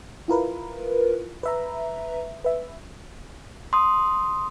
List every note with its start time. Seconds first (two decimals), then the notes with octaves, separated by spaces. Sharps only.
0.28 E4 F4 A#4 B4
1.43 B4 E5 A#5
2.44 B4 E5
3.73 C6 D#6